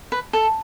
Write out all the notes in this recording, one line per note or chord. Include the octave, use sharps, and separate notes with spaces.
B4
A4